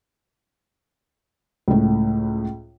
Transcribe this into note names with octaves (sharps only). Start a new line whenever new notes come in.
C#2 A2